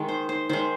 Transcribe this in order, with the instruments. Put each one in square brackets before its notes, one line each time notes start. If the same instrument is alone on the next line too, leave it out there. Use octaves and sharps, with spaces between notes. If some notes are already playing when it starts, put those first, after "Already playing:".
Already playing: [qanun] D#3 G#3
C5
C5
D#3 G#3 C5